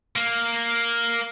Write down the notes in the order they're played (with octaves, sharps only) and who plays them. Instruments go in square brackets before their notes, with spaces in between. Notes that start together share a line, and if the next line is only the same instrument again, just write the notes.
[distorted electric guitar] A#3